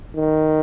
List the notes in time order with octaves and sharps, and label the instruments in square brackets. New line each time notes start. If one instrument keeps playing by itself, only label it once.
[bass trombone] D#3